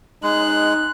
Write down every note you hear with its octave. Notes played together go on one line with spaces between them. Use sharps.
G#3 D#4 F#6